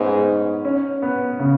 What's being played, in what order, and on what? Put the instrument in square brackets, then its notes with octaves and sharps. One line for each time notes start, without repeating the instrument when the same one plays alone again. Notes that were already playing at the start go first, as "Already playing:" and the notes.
Already playing: [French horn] G#2 [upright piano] B3 C#4
[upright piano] C#4
B3
C#3